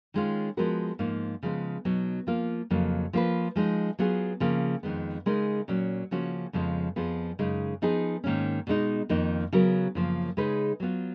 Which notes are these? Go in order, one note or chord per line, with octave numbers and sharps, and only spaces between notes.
D#3 G#3 C#4 F4
F3 G#3 B3 F#4 A#4
G#2 F3 A#3 F4
C#3 F3 G#3 B3
B2 F#3 B3 D#4
F3 A#3 F4 A#4
F2 C#3 F#3 A#3
F3 A#3 F4 B4
F3 G#3 D#4
F#3 B3 F4 G#4
C#3 F3 A#3
F2 D#3 G#3 B3
C#3 G#3 D#4 A#4
A#2 F#3 C#4
C#3 F3 A#3 C#4 F#4
F2 C#3 F3 G#3 B3
F2 F3 B3 F4 G#4
F#2 C#3 G#3 D#4
F3 B3 D#4 G#4
G#2 D#3 A#3 C#4
B2 G#3 D#4
F2 D#3 A#3 D#4
C#3 F#3 B3 F#4 A#4
F#2 C#3 F3 A#3
C#3 G#3 D#4 G#4 B4
F#3 B3 F4